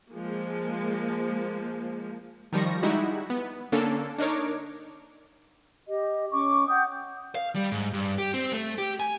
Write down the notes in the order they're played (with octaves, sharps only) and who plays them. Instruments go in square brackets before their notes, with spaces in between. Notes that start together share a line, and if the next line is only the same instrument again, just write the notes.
[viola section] F3 G#3 A#3
[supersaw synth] D#3 F3 G3 C#6 A#6
G3 G#3 D#4 E4 F#4
B3
D3 A#3 C#4 D4 A4
D4 D#4 A#4 C#5 D6
[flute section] G4 D#5
C#4 C#6 D6
F#5 G5 D#6 G6
[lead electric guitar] F5
G3
G#2
G2
G4
C4
A3
G4
G#5